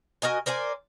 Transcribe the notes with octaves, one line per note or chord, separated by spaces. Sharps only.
F#4 A#4 D#5 G#5
A#4 C5 D5 G#5